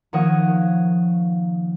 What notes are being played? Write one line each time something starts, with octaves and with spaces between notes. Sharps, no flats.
D#3 F3 A#3 C#5 F#5 D#6